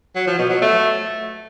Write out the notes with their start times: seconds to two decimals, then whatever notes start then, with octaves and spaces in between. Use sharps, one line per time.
0.15 F#3
0.27 F3
0.39 B2
0.50 F#3
0.62 A3